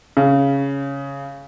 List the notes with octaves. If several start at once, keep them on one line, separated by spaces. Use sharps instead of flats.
C#3